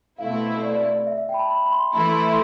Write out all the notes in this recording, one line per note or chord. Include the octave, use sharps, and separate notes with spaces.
B2 A3 C4 E4 F5
D5
D5
D5
D5
E5
E5
G5
B5
A5
B5
B5
C6
E3 A3 E4 B5
C6
B5
C6